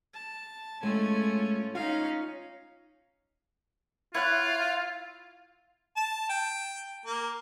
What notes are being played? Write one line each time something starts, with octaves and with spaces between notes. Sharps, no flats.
A5
A2 G#3 A3 C#4 F4 G#5
C#4 D#4 F4 F5
E4 F4 C#5 F5 F#5 F#6
A5
G5
A#3